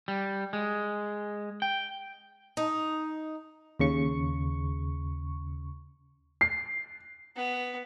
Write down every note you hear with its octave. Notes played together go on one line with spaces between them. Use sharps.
G3
G#3
G5
D#4
D#2 C#3 C#6
C7
B3